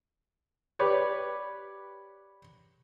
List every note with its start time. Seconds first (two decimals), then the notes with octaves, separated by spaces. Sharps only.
0.79 G4 B4 C#5 D5